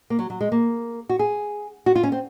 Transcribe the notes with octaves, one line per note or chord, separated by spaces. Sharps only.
A#3
F#3
F#3
G#3
A#3
F#4
G#4
F#4
F4
C#4
C4